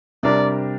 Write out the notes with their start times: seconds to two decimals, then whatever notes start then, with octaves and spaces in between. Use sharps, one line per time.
0.23 C3 G3 D4 G4 A#4 D5